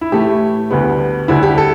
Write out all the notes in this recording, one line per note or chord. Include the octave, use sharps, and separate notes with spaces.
E4
A2 E3 A3 G4
D2 D3 G3 B3
D2 D3 G3 E4
G4
A4